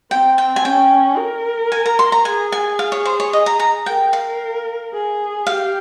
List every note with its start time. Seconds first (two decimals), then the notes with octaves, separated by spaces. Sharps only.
0.11 C4 G5
0.38 G5
0.56 G#5
0.65 C#4 G5
1.18 A#4
1.72 G#5
1.86 A#5
1.99 C6
2.12 A#5
2.25 G#4 G#5
2.52 G#5
2.79 F5
2.92 C#5
3.05 C5
3.20 C#5
3.33 D#5
3.46 A#5
3.60 A#5
3.86 A#4 G5
4.13 F5
4.94 G#4
5.47 G4 F5